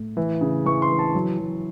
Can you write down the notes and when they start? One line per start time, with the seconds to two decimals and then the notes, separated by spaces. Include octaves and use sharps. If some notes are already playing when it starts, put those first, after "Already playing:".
Already playing: A2
0.17 E3
0.41 C#3
0.66 E3 C#6
0.82 C6
0.91 E3
0.99 A5
1.15 F#3
1.39 F#3